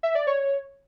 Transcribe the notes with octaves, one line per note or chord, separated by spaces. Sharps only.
E5
D5
C#5